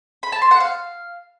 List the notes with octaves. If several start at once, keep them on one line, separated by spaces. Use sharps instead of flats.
B5
A5
C6
F#5
F5